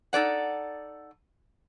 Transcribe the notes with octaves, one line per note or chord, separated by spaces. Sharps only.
D#4 A4 D5 F#5